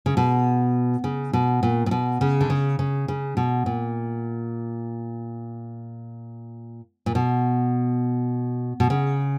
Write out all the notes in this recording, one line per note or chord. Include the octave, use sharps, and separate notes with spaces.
C#3
B2
C#3
B2
A#2
A#2
B2
C#3
D3
C#3
C#3
C#3
B2
A#2
A#2
B2
B2
C#3